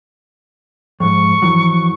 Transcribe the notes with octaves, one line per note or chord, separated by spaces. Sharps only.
F2 G#2 C#6
F2 E3 F#3